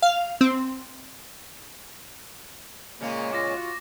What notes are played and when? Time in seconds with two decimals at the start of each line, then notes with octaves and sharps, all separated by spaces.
0.02 F5
0.41 C4
3.01 A#2 C#3 G#3 A#3 C#4
3.33 F4 D6 A#6
3.56 F#4 F#5